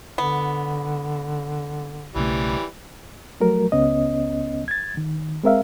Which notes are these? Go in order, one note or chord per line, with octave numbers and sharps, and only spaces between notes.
D3 B3
B1 C#3 E3 G3 A3
F3 F#3 A3 A#4
C#2 B3 C#4 D#5
G#6 A6
D#3
G#3 C4 A#4 E5 F5